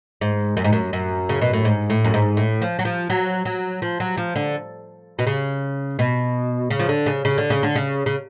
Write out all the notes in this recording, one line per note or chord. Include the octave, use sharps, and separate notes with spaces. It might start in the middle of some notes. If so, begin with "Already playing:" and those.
G#2
F#2
G#2
F#2
F#2
C#3
B2
A2
G#2
A2
F#2
G#2
A2
F3
F#3
F3
F#3
F#3
F3
F#3
F3
D3
B2
C#3
B2
C#3
F3
D3
C#3
C#3
D3
C#3
D3
C#3
C#3